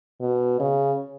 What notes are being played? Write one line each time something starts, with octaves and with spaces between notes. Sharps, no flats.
B2
C#3